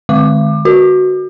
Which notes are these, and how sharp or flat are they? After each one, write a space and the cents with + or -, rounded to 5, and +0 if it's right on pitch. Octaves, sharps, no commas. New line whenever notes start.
D#3 -45 G#3 +20 D6 +25
F#4 +0 B4 -5